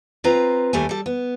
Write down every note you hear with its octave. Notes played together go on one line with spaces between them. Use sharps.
C4 F4 B4 A#5
D#2 G3 A3 E4 G#5
G3 A4
B3